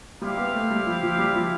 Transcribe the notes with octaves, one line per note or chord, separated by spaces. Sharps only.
G3 E4 G4 C5 F5
B3
A3
G3
F3
F3
G3
F3